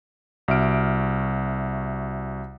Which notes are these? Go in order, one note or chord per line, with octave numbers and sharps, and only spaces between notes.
C2 F#4 E5 F6 D7